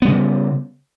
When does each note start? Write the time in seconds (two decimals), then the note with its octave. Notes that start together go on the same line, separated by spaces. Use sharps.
0.02 B3
0.05 G3
0.08 C#3